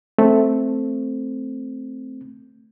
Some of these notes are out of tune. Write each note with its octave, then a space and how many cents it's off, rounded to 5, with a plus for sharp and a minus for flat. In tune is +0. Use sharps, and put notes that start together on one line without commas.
A3 +0 C4 +0